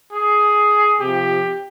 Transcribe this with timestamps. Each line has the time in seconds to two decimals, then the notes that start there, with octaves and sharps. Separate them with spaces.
0.13 G#4
1.00 C3 F3 G4